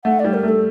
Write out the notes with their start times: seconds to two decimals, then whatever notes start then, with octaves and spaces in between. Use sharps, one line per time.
0.04 A3 F#5
0.19 D5
0.25 G3
0.34 A#4
0.43 A3
0.48 A4